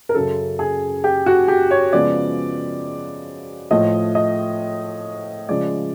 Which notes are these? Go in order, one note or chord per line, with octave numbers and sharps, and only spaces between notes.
A#4
F#2 C#3 F#3 A4
G#4
G4
F#4
G4
C#5
C#3 F3 G#3 B3 D5
A2 F3 A3 D#5
D#5
C#3 F3 G#3 D5